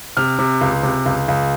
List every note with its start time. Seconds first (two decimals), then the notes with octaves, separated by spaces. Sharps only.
0.17 C3 F6
0.39 C3
0.61 C#2
0.83 C3
1.06 C#2
1.28 C#2